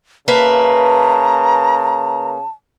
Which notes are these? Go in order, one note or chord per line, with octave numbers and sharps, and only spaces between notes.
C#3 A#3 B4 E5 A5 A#5